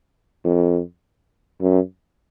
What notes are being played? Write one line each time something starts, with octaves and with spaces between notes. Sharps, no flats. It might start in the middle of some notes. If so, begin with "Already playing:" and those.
F2
F#2